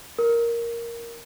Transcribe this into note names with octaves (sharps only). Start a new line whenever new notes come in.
A#4